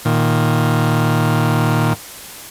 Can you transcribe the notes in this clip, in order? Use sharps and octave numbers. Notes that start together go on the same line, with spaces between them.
A#2 D#3